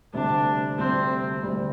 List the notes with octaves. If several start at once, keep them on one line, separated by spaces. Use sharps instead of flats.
D2 C3 G3 D4
D2 C3 G3 C4
D2 C3 G3